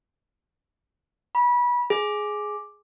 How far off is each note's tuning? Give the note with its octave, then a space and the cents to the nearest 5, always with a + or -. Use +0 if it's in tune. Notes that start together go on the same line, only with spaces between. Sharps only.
B5 -25
G#4 +10